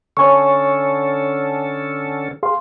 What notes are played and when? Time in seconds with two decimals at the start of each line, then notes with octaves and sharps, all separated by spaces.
0.17 D3 C#4 A4 C#5 G#5 C#6
2.43 G#4 F5 C6